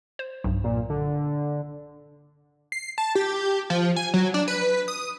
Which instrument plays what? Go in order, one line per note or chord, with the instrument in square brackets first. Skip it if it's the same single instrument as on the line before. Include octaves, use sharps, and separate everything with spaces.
[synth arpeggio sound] C5
B1 G2
[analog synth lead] A#2
D3
[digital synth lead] C7
A5
G4
F3
G#5
F#3
D4
B4
D#6